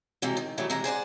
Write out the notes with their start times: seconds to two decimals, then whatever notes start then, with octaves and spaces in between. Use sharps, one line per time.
0.22 C3 E3 F#3 G#3
0.37 D#3
0.58 C#3 E3 F#3 G3 A3
0.70 C3 E3 G#3 A#5
0.84 G#4 C5 D5 F#5